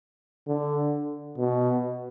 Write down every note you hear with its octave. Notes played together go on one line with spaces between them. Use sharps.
D3
B2